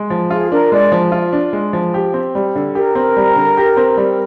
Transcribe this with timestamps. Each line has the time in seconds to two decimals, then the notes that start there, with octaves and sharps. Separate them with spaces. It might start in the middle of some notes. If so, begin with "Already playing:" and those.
Already playing: G#3
0.10 F3
0.30 F4 G#4
0.51 D4 A#4
0.72 G#3 D5
0.92 F3
1.12 F4
1.33 D4
1.53 G#3
1.73 F3
1.94 G4
2.14 C4
2.35 G3
2.55 D3
2.75 G4 A#4
2.95 C4
3.17 G3
3.36 D3
3.57 G4
3.77 C4
3.97 G3